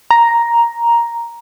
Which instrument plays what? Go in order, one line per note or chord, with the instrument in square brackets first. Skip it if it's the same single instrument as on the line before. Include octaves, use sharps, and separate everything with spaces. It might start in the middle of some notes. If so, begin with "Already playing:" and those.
[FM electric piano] A#5